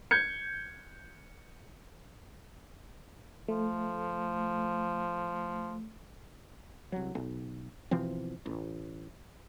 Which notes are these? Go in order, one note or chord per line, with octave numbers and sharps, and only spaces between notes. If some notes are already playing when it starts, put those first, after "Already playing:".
G6 G#6 C#7
F3 A3
C2 F#3
B1
B2 E3 F3 C4
A1